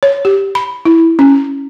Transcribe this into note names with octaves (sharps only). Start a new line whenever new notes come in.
C#5
G4
B5
E4
C#4